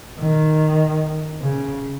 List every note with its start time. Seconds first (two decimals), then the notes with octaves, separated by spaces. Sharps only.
0.19 D#3
1.41 C#3